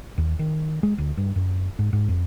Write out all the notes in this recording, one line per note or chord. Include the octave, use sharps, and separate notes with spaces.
D#2
D#3
G#3
D2
G2
F#2
G#2
G#2
F2